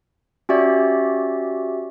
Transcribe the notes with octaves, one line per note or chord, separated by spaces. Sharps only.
C#4 F#4 G4 D5 E5